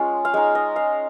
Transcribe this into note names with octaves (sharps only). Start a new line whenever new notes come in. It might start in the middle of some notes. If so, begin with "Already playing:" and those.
Already playing: G#3 C#4 F4
F5
G#3 D#4 G#5
D#5
F5